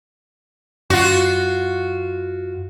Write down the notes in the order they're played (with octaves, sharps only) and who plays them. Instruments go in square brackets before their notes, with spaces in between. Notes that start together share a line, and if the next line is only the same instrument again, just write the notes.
[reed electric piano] F#2 [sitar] F4 F#4